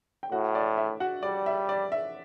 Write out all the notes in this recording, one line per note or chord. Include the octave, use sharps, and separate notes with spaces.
G5
A2 F#4 F#5
D5
E5
F#4 F#5
G3 D5
E5
D5
E5